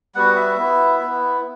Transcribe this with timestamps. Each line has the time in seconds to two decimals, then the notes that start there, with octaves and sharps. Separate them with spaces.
0.15 G3 B3 F#4 F#5
0.36 E5
0.57 B3 E4
0.99 B3 E4